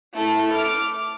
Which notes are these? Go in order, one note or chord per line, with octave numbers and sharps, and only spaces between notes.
A3 E4 A4
D6 F6